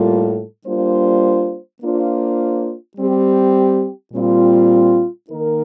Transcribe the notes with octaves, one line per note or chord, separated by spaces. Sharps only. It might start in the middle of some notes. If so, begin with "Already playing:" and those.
Already playing: A2 G3 A#3 F4 A4
G3 A#3 D4 F4 C5
A#3 D4 F4 C5
G3 C4 G4
A#2 G3 C4 F4
D#3 A#3 D#4 A#4